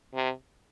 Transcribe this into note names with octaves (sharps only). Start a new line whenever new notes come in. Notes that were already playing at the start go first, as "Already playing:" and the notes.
C3